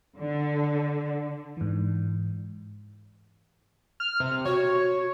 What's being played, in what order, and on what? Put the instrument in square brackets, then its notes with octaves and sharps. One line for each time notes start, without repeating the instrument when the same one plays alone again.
[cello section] D3
[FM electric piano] G#2 E3
[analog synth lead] F6
C3
[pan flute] F#4 [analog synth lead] C#5